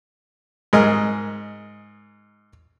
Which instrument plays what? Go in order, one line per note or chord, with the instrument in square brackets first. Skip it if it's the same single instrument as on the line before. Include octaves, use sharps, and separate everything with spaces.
[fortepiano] G#2 G#4 A#4 D#5